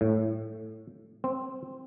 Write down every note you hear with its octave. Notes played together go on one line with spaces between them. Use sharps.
A2
C4